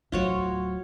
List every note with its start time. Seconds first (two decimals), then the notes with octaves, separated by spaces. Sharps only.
0.12 D1 F#3 F4 F#4 C#5